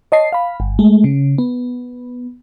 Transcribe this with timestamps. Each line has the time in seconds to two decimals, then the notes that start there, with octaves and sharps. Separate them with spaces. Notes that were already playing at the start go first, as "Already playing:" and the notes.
0.12 C#5 D#5 A5 C7
0.32 F5 B5
0.60 G1
0.79 G#3 A3
1.04 C#3
1.38 B3